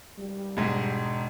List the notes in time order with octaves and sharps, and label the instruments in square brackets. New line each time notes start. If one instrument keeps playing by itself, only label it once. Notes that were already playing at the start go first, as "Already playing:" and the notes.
[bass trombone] G3
[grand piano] E1 G#2